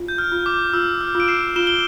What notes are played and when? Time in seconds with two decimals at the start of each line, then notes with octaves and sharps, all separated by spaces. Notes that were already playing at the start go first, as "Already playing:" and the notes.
Already playing: F4
0.08 G6
0.18 F6
0.32 F4
0.46 D6
0.73 F4 E6
1.01 F6
1.15 F4
1.20 D7
1.28 C7 E7
1.56 F4 E7 G7
1.67 G7